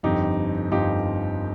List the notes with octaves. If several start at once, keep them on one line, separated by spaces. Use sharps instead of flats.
G1 F2 D3 F3 D#4 G4
G1 F2 D3 F3 D#4 G4